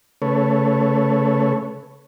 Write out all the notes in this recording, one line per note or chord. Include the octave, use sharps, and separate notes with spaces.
C#3 A3 A4 B4 C#5